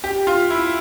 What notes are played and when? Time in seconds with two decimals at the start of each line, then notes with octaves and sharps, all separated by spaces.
0.04 G4
0.27 F4
0.50 E4